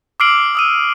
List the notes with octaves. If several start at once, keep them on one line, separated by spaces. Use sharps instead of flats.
D6 E6 F6 C7 D7 F#7
D#6 E6 D#7